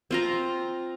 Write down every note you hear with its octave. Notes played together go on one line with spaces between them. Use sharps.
C4 F4 A#5